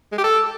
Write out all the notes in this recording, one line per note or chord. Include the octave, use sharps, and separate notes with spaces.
G#3
G4
A4